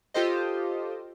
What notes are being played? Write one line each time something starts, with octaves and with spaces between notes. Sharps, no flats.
F4 G4 A4 C5 D#5